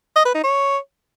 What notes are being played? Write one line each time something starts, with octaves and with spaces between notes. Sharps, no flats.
D#5
B4
D#4
C#5